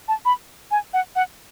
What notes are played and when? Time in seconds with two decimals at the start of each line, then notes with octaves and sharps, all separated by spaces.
0.08 A5
0.25 B5
0.71 G#5
0.93 F#5
1.16 F#5